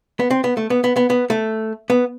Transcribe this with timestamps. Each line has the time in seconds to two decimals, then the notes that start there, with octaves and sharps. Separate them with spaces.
0.20 B3
0.30 C4
0.44 B3
0.57 A3
0.70 B3
0.84 B3
0.96 B3
1.10 B3
1.30 A3
1.90 B3